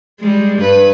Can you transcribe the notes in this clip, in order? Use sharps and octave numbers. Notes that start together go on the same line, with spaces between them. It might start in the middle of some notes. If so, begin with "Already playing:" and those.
G3 G#3
G2 B4